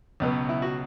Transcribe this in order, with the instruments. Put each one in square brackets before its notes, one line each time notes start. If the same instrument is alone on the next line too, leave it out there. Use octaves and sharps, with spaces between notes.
[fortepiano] C#2 B2 F#3 B3
E4
F#4